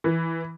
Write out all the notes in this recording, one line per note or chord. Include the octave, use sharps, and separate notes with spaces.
E3